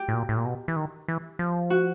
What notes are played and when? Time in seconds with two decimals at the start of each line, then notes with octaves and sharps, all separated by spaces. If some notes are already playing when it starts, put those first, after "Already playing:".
Already playing: G4
0.08 A2
0.14 A#2
0.29 A2
0.37 A#2
0.45 B2
0.68 E3
0.76 D#3
1.08 E3
1.39 F3
1.70 F#4